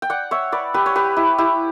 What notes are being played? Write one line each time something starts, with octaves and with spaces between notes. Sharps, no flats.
G5
D5 F#5
C#5 E5
B4 D5
G4 B4
C#5
G4 B4
E4 G4
E4 G4